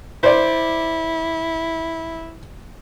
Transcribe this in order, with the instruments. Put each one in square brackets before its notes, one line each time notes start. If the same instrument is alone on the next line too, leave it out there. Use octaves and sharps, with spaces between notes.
[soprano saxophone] E4 [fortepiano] C5 D5